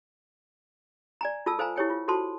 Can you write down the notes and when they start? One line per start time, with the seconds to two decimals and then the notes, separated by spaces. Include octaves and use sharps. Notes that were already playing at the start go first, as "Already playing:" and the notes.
1.21 D5 G#5 A#5
1.46 F4 A4 A5 E6
1.59 A4 C5 F5 G#5 A#5
1.76 E4 G4 A4 C#5 G5 G#5
1.90 F4
2.08 F4 F#4 A4 C5 A5 C6